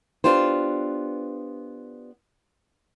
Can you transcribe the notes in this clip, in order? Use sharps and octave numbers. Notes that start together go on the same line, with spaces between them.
B3 D4 F4 G4 C5